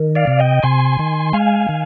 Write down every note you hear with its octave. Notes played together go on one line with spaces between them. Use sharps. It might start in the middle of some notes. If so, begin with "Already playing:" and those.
Already playing: D#3
D5 F5
C3
D#5 G5
C3 G#5 C6
D#3
G#3 F5 G#5
D#3